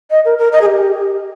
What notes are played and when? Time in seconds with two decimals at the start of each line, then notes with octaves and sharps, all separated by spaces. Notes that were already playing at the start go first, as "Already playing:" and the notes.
0.10 D#5
0.25 A#4
0.38 A#4
0.52 D#5
0.61 G#4
0.66 G4